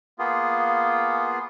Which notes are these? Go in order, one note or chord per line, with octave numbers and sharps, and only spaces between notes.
A#3 B3 F4 G#4